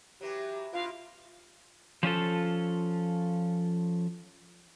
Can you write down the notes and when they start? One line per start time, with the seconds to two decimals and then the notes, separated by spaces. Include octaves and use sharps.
0.21 E3 F#3 G4
0.73 B2 D4 E4 F4 F5
2.03 F3 C#4 F4 A4